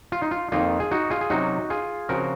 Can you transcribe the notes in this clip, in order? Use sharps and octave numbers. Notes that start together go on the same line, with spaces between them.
F4
D#4
F4
F2 D#3 A#3 D#4 F4
G#4
D#4 F#4
F4 G#4
G#4
C3 F#3 C#4 D#4 F#4
F4 G#4
C#3 F3 C4 F#4 A#4